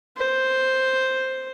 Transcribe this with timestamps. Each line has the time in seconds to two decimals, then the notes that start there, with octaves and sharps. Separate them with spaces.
0.17 C5